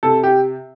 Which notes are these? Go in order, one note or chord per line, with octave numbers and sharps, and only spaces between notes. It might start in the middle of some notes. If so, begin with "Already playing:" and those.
C3 A4
G4